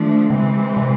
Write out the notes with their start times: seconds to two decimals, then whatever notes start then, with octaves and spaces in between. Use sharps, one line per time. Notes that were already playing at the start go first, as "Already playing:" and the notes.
Already playing: D#3 F3 A3 D4
0.30 C#3 E3 G#3 C4
0.77 C3